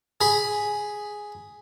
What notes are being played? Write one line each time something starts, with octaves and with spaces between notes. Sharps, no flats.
G#4 B5